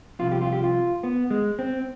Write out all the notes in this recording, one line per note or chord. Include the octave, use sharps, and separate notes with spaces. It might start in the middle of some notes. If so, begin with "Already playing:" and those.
C2 C3 F3 F4
G4
F4
G4
F4
B3
G#3
C4